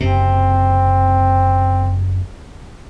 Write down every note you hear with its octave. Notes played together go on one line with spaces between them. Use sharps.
F#1 C3 C4